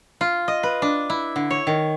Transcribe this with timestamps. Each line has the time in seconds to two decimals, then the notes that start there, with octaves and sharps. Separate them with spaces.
0.21 F4
0.48 D#5
0.63 B4
0.82 D4
1.10 E4
1.36 D3
1.50 C#5
1.67 D#3